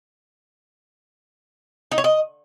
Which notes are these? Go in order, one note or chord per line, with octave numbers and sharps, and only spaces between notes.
D#4
C#5
D#5